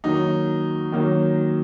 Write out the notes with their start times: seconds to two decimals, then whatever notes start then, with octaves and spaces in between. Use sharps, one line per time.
0.04 D#3 F#3 A#3 D#4
0.92 D#3 F#3 A#3 D#4